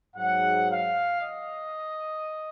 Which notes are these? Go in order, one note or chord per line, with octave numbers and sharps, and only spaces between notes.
G#2 F#3 F#5
F5
D#5